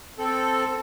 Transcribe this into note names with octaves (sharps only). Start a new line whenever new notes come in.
C4 A4